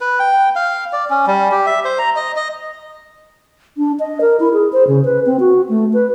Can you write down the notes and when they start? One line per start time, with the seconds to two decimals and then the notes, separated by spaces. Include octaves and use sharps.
0.01 B4
0.20 G5
0.56 F5
0.93 D5
1.10 C#4
1.27 G3
1.52 G4
1.66 E5
1.85 C5
1.99 A#5
2.16 D#5
2.36 D#5
3.78 D4
4.00 D#5
4.21 A#4
4.40 E4
4.53 G#4
4.73 C5
4.87 C#3
5.05 B4
5.26 C4
5.40 F#4
5.69 A3
5.93 B4